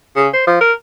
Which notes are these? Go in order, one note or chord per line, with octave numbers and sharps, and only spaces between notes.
C#3
C5
F3
A#4